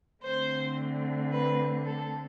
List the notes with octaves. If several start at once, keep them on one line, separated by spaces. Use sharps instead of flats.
D3 A3 C4 C5
B4
A4